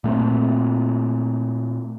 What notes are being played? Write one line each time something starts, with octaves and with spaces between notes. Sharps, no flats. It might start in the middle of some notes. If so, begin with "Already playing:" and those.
A#2 A3 A#3 C4